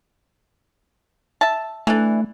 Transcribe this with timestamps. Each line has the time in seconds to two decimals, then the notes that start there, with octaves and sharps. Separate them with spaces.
1.41 E5 A5
1.87 E3 A3 D4